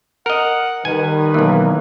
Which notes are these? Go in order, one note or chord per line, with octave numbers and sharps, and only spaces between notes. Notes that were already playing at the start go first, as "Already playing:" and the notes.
A#4 D#5 F#5
D#3 G3 B4 G#5
B1 E3 A#3